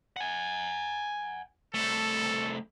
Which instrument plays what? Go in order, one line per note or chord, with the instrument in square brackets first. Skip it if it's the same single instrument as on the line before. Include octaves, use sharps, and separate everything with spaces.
[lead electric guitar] F#5 G#5
[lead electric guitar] C2 A3 [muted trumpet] A4